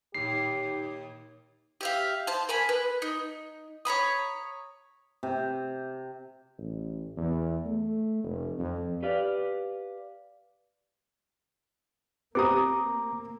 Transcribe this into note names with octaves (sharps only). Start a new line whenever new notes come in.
D#2 A#2 G4 C7
G4 E5 F5
C5 A5
A#4 G#5 B5
B4
D#4
C#5 A#5 B5 D#6
C3
A1
E2
A3
F1
F2
G4 B4 D5 F5
A#3 C4 G4 B4 A#5 D6 D#6